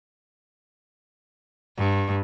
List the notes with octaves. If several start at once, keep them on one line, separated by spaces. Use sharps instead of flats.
G2